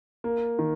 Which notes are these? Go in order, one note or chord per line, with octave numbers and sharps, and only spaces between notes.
A#3
D#3